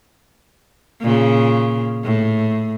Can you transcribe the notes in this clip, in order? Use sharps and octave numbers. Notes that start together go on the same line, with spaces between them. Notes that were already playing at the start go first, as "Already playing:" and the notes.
A#2 C#3
A2